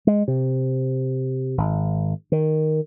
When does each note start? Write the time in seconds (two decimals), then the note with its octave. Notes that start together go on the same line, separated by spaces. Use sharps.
0.07 G#3
0.28 C3
1.58 G#1
2.32 D#3